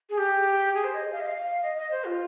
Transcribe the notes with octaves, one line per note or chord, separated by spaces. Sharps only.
G#4
G4
G#4
C5
D#5
F5
D#5
F5
D#5
D#5
C5
F4